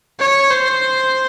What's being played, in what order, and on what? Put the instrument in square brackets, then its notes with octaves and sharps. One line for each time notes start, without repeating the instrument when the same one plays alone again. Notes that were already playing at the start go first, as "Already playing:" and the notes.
[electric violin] C#5
C5